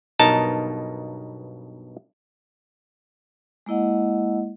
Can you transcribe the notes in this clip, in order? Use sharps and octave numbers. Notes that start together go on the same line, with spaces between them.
B1 G2 B2 D#4 A#4 A5
G#3 A#3 E4 D#5 F#5